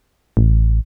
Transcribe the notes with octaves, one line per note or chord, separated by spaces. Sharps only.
A1